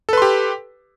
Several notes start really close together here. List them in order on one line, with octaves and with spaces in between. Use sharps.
A4 B4 C6 G4